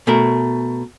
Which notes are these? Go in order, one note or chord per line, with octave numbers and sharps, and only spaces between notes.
B2 A3 A#4